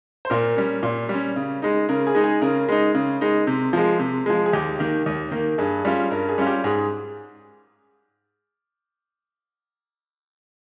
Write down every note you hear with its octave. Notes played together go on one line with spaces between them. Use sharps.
C5
A#2 A#4
G3 C#4
A#2
G3 C#4
C#3
G#3 D#4
C#3 A#4
G#4
G#3 D#4
G#4
C#3 A#4
G#3 D#4
C#3
G#3 D#4
C3
F3 G#3
C3
F3 G#3
G#4
D#2 G4
D#3 A#3
D#2
D#3 A#3
G2 G#4
G3 C#4 F4
G2 A#4
G#4
G3 C#4 F4
G4
G#2 G#4